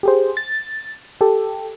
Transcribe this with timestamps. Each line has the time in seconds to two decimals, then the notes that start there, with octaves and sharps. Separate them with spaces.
0.03 G4 G#4 C5
0.37 A6
1.21 G4 A4